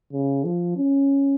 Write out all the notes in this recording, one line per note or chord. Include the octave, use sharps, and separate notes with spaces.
C#3
F3
C#4